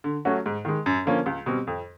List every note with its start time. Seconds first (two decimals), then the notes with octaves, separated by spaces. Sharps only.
0.04 D3
0.25 F#3 A3 C#4 F#4
0.46 G#2
0.65 D#3 G#3
0.86 F#2
1.06 D3 F3 A#3 C#4
1.26 C#2
1.46 B2 G3 C4
1.67 F2